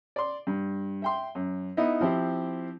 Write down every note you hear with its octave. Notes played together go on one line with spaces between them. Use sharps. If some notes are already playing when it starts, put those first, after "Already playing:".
D5 C6
G2
E5 G5 C6
F#2
B3 D#4 E4 D#5
F3 C4 E4 G4